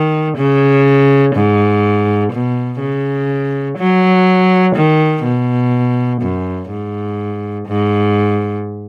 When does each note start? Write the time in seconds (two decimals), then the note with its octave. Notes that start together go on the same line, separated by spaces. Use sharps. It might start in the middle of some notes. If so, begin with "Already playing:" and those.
Already playing: D#3
0.37 C#3
1.36 G#2
2.32 B2
2.81 C#3
3.79 F#3
4.76 D#3
5.25 B2
6.22 F#2
6.70 G#2
7.68 G#2